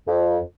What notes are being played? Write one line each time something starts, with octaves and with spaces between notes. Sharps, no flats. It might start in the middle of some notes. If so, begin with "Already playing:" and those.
F2